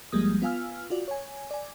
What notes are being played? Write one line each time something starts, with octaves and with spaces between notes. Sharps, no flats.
G1 F3 G3 G#3 A#3 D#6
B3 F4 F5 G#5 E6 F6
F4 F#4 D5
C#5 G#5
D5 G#5